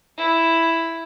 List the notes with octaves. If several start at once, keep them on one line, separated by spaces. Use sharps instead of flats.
E4